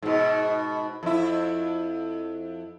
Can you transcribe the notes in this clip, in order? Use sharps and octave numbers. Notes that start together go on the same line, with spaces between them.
G#2 B2
F2 E4